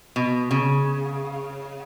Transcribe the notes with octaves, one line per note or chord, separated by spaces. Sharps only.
B2
C#3